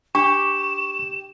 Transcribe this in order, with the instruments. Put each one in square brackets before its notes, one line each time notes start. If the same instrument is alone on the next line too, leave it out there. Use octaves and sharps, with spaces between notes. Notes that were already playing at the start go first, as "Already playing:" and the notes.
[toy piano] D4 [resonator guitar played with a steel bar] G4 [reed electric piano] C#6 [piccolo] E7